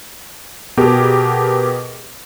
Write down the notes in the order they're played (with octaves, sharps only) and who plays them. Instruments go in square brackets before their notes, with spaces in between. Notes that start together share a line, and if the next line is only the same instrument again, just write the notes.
[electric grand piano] B2 B3 G4 G#4 A#4